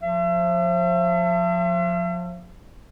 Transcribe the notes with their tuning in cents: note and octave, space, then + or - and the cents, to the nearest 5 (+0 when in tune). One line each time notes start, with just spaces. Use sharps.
F3 +30 E5 +40